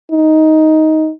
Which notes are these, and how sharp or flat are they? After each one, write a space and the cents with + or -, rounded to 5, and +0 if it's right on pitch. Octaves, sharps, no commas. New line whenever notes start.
D#4 +10